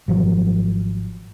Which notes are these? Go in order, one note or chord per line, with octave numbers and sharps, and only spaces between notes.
G#1 F3 F#3